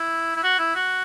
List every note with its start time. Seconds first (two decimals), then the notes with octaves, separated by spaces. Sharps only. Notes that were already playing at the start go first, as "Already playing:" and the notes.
Already playing: E4
0.36 E4
0.43 F#4
0.59 E4
0.75 F#4